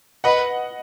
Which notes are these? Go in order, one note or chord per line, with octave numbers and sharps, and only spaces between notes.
B4 D#5 F#5